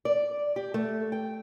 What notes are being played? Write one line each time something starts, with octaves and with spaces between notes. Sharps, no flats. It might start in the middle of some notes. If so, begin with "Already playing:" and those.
D5
G4
A3
G5